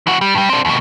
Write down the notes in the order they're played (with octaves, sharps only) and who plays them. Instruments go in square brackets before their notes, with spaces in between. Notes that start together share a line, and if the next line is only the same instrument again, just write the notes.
[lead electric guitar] E3 F#4
G3
G2 G3
C4 D4
D#2 B2